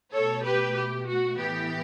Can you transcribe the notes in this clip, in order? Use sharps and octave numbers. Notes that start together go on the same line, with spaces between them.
B2 A3 A4 C#5
G4 B4
G4
F#4
A2 E3 B3 G4